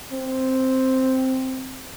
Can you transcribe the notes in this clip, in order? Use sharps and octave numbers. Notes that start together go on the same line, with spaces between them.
C4